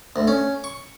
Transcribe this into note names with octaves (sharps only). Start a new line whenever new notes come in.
D2
C#4
C#6